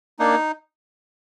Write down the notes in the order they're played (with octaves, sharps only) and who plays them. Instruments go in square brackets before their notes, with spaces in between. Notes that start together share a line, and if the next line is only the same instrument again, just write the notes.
[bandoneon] A#3 D4 D#4